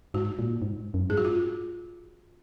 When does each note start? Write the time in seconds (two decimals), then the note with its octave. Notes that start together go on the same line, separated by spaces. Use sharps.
0.14 G#2 F#4
0.39 A#2
0.62 G#2
0.94 F#2
1.10 G#2 G#4
1.17 F#4
1.25 F4